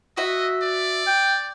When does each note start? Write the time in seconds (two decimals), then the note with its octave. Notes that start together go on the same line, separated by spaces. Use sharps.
0.17 F#4 D#5 E5
0.62 D5
1.07 G5